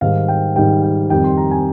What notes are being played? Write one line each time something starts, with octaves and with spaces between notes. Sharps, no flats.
G#2 D#3 G3 F5
G5
G#2 D#3 G3 G5
G5
F2 D#3 G3 G5
C6
A#5
G#5